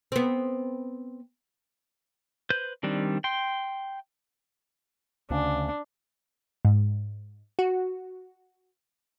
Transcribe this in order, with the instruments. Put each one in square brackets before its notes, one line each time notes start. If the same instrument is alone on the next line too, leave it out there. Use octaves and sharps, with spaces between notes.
[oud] B3 C4
[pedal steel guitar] B4 C5 G6
D#3 G3 C4 D4
G5 C6
[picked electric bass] D2 C#3 [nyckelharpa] D4
[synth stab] G#2
F#4